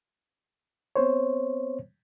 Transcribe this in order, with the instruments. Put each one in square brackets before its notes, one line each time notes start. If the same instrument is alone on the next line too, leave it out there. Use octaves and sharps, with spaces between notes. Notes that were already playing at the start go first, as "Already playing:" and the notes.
[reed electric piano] B3 C4 C5 C#5